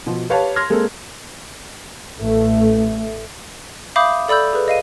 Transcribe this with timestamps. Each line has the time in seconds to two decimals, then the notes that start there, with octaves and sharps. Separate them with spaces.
0.06 B2 F3
0.30 G4 B4 C#5 F5 A5
0.56 C6 F6 G#6 A#6
0.70 G#3 A#3 C4 G#4 A4
2.18 A1 A3
3.96 E5 F5 B5 D6 D#6 G6
4.28 A4 D5 B5 E6 G6
4.53 G#4 B4
4.68 D#5 F5 D#7